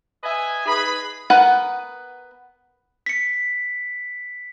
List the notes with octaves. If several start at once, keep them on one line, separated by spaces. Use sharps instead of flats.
B4 D#5 E5 G#5
D#4 G#4 B4 B5
B3 A#4 B4 F#5
B6 C#7